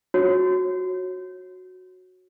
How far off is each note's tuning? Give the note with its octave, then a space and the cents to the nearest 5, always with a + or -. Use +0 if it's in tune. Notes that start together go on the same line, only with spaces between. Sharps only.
F#4 -5 C#5 -25